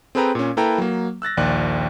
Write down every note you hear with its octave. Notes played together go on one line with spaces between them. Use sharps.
C4 G#4 A4 B4 G5 A#5
A#2 C#4
A#3 E4 A4 B4 G5 A#5
F#3 A#3
E6 F#6 A6 A#6
A#1 D#2 D5 F#6